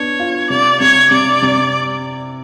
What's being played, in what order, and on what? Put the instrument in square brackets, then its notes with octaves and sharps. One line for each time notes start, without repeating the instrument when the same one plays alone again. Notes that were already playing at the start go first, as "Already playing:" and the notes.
Already playing: [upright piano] B3 D4 [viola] C#5
[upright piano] F4
[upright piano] C3 [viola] D5
[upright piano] C3 [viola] C#5
[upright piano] C3 [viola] D5
[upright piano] C3